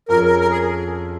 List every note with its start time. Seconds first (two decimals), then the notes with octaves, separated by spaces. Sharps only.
0.09 F2 F3 C#4 G#4 A#4
0.24 A#4
0.40 A#4
0.51 G#4